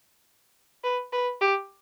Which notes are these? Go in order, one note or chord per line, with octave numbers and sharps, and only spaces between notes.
B4
B4
G4